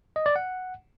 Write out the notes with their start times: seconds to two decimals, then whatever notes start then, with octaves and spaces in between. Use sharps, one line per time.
0.16 D#5
0.26 D5
0.36 F#5